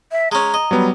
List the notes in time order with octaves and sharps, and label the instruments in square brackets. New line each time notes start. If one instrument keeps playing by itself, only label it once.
[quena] E5
[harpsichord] G#3 C#4 [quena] A#5
[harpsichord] D#5
[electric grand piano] F#3 G3 B3